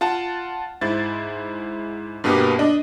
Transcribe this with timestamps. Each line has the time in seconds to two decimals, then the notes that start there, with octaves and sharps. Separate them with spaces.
0.01 F4 F#5 A5
0.81 G#2 E4 C5 A6
2.24 G2 B2 A#3 B3 G4
2.59 D4 D#5